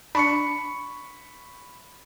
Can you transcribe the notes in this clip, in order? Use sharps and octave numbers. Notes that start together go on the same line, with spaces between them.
D4 B5 C#6 C#7